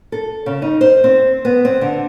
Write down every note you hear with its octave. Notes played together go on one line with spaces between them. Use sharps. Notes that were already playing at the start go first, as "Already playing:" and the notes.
A4
C#3
D#4
C5
C4
B3
C4
D3